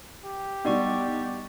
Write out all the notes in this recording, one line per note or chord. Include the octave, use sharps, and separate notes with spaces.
G4
G3 B3 D4 D#4 D5 C#6